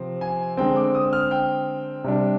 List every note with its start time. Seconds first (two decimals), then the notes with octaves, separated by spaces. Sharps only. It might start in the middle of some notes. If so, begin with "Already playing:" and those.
Already playing: C3 F3 C4
0.21 G#5
0.57 D3 G#3 C4 G5
0.76 D6
0.95 D#6
1.13 F6
1.31 G5
2.04 C3 G3 D4